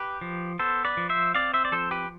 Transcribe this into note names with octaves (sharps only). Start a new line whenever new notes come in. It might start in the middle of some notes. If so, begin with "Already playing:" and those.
Already playing: G4 B4
F3
B3 A4 C5
B4 D5
F3
C5 E5
C4 D5 F5
C5 E5
D5
F3 A4 C5
G4 B4